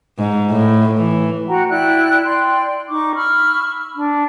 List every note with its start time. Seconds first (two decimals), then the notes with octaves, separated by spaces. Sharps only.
0.18 G#2
0.50 A2
0.98 E3
1.48 F#4 F#5 G5 A#5
1.68 E4 D5 G5 F#6
2.25 D5 G5 C6
2.88 D#4 C#6 D6
3.15 B5 C#6 E6 F6
3.95 D4